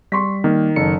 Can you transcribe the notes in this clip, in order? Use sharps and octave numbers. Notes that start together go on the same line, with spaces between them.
G3 C6 C#6 B6
D#3 A#3
F#1 A4 C#7